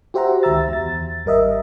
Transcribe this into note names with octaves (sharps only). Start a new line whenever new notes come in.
F#4 G4 C5 E5 F#5 A#5
C#2 D#3 E5 A#5 E6 A6
E2 A6
G#1 G3 A#4 D#5 E5